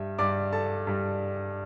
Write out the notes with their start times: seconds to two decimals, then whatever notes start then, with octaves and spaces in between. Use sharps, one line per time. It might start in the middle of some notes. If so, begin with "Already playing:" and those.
Already playing: G2 G3 E5
0.19 G2 G3 D5 D6
0.52 A4 A5
0.87 G2 G3